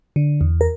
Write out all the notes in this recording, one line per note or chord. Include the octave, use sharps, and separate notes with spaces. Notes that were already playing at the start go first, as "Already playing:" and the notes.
D3
E2
A#4